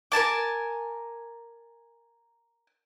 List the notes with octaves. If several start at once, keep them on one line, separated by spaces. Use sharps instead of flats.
A#4 G#5 A5 D6